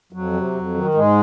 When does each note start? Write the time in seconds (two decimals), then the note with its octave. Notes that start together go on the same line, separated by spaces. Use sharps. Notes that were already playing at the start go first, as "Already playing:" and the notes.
0.12 F2 F#3
0.33 C3
0.54 F2
0.74 D#3
0.94 G#2 G#3